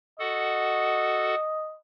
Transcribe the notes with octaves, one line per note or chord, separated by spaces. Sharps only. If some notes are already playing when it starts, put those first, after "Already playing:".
F#4 A4 D#5 F#5